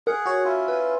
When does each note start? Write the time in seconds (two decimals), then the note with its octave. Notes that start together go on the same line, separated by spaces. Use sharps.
0.07 G#4 A#4 F#5
0.26 F#4 C#5
0.44 C#4 E4 F4
0.68 B4